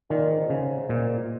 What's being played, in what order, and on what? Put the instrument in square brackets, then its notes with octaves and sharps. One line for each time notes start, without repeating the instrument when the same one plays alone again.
[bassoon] A#2 [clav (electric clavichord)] D#3
[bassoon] G#2
[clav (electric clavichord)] C#3
A#2